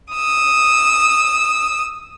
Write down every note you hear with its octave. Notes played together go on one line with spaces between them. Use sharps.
D#6 E6